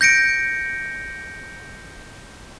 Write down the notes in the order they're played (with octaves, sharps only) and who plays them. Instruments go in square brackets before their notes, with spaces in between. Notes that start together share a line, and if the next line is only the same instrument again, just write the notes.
[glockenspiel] G6 A#6 C#7 D7